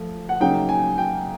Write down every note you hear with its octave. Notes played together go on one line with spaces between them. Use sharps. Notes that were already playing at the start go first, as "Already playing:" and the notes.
Already playing: F3 A3
F#5
C#3 F#3 A#3 D#4 G5
G#5
G5